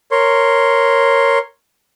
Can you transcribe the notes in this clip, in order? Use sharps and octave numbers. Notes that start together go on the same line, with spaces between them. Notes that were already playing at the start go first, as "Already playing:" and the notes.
A#4 C#5 C6